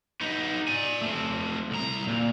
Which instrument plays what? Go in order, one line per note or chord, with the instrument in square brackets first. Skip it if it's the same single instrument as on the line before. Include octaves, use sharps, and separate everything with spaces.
[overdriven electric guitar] B3 D#4
D5 G#5
A3 C4
C2 A#5
A#2